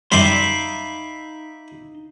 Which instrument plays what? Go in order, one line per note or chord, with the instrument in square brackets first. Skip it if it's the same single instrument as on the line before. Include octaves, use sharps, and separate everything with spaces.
[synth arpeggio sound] F#2 G3 [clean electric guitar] D#4 F5 C6 [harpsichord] E5 B5 D6